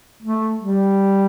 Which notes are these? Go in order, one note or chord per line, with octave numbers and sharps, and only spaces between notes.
A3
G3